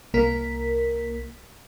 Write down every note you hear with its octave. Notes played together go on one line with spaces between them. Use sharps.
C2 A#3 A#4 B6